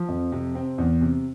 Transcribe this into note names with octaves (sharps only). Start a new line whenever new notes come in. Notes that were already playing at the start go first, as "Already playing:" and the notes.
Already playing: F3
F2
C3
C4
E2
C3